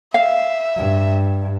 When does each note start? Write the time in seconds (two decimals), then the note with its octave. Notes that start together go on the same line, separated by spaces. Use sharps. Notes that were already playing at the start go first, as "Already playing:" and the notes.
0.14 E5 F5
0.77 G2